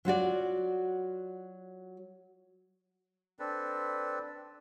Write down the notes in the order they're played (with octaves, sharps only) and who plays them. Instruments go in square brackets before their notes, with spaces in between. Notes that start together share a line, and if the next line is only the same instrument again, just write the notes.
[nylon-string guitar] F#3 F4 F#4 D5
[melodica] C4 D4 A4 B4